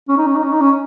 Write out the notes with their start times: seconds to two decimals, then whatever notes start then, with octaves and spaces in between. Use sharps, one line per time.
0.08 C#4
0.18 D#4
0.27 C#4
0.35 D#4
0.43 C#4
0.52 D#4
0.61 C#4